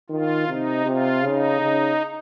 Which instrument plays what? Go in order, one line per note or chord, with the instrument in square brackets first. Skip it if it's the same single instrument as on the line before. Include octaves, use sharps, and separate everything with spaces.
[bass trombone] D#3 [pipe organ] F4
[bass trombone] C3 [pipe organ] D#4
[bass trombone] C3 [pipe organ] F4
[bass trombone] C#3 [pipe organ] D#4
[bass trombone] C#3